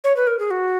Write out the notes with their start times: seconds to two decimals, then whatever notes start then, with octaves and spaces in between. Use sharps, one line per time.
0.04 C#5
0.16 B4
0.27 A#4
0.39 G#4
0.51 F#4